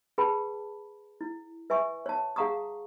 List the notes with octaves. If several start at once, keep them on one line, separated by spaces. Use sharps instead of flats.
G#4 B4 G5 A5 B5
E4
B4 E5 G#5 C#6
C#5 A5
G#4 F5 F#5 A#5 C#6 D#6